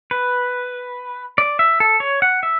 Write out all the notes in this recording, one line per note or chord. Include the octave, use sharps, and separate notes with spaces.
B4
D5
E5
A4
C#5
F#5
E5